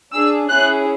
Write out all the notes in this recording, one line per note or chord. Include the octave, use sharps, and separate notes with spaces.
D4 G#4 E6
C#4 E4 G#4 F#6